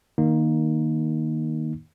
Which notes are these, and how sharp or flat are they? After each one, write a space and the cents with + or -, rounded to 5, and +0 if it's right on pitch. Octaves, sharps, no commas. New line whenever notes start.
D#3 +0 A#3 +10 D#4 +0